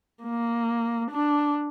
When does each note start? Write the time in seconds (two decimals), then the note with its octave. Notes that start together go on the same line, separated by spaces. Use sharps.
0.23 A#3
1.12 D4